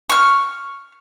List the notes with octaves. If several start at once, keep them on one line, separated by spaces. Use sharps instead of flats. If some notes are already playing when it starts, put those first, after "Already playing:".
C#6 F6